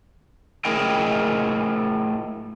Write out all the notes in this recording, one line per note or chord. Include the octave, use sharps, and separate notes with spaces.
A3 E4 G#4 A#4 D#5 G5